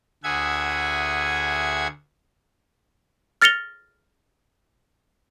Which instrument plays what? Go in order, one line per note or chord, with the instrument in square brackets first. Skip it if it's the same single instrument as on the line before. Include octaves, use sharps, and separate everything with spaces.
[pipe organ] D2 G#4 E5 F#5 G#5 G#6
[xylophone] F6 A6 A#6 C#7 F7 G7